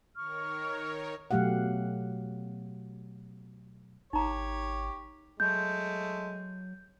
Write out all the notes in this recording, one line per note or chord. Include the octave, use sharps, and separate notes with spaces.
D#3 A#4 C#5 C#6 F6
B2 F#3 A3 G4 F5 F#5
G#1 D#4 G4 C#5 A#5
F#3 G#3 A3 G6